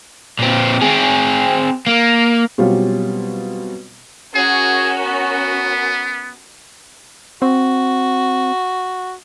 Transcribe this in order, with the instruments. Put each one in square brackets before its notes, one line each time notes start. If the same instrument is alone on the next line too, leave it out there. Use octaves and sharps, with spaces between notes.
[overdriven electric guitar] A#2 C4
C4 G#4
A#3
[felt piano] B2 F#3 G3 C4 C#4 F4
[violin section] C#4 F#4 A#4 [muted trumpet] G#4
[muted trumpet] B3
[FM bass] C4 [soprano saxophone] F#4